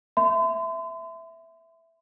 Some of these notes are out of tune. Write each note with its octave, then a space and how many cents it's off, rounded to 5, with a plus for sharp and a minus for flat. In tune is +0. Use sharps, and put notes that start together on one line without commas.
E5 +0 C6 -40